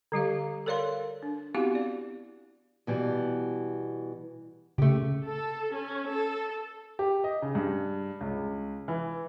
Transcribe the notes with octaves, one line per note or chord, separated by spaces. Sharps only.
D3 G3 G4 F5
A4 A#4 C#5 D5 F5 C6
D4
B3 C4 E4 F#4 G4 F5
D5
B2 E3 G3
C#3 A3 G4
A4
C#4
A4
G4
D#5
C#3
G2
C#2
E3